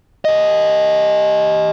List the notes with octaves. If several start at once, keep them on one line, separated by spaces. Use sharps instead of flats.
G4 D#5